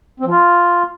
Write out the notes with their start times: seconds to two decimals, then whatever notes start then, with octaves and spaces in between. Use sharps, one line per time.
0.20 C4
0.25 F3
0.31 F4